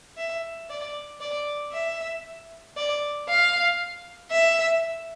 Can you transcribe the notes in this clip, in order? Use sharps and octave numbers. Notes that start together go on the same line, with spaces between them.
E5
D5
D5
E5
D5
F5
E5